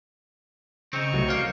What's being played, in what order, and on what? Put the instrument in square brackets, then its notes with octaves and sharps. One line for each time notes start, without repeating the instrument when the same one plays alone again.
[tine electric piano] C#3 [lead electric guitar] C4 D#4 [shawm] C#6
[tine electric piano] C2 A3 [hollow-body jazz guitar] F#3
[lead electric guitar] A#3 [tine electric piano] F5 G6